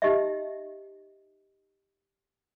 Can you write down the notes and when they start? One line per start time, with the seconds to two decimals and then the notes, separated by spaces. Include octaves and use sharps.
0.02 D#4 G4 D#5 E5